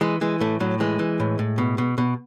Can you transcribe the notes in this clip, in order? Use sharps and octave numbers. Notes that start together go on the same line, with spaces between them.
E3 G#3
E3 G#3
A2 A3
A2 F#3
E3 G#3
E3
A2
A2
B2
B2
B2